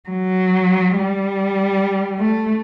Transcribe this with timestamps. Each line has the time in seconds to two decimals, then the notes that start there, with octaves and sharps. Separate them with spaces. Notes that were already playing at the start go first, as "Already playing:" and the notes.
0.09 F#3
0.99 G3
2.19 A3